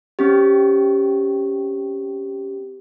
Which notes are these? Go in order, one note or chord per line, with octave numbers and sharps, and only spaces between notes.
C4 C#4 G4